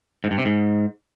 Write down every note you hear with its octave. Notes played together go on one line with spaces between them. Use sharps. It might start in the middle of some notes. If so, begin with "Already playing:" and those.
G#2
G2
C3
G#2